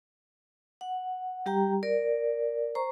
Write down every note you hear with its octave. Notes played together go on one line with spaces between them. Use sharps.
F#5
G3 G4 G5 A#5
A#4 D5
C5 A#5 C#6